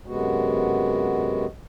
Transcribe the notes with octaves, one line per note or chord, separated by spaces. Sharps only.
F#2 C3 G#3 B3 F#4